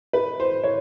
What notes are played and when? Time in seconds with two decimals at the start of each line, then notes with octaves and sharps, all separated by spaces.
0.13 B4
0.40 C5
0.64 C#5